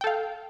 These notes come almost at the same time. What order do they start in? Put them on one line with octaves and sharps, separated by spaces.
G5 A4 F5